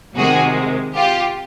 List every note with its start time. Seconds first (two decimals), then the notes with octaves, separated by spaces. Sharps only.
0.16 C3 D#3 G#3 F#4 G#4
0.96 F4 G4